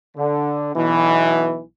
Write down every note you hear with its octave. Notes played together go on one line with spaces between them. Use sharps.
D3
B1 B2 E3